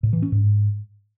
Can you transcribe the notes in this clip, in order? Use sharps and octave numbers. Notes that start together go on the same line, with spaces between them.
A2
E3
C#4
G#2